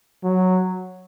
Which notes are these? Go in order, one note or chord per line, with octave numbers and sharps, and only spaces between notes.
F#3